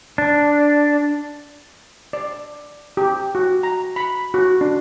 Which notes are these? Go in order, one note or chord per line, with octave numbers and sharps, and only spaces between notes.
D4
D5
G4
F#4
A#5
B5
F#4
D4